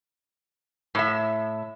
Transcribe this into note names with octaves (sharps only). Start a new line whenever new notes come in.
A2 E5